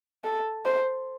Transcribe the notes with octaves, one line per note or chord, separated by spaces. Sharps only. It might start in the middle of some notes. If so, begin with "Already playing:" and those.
A4
C5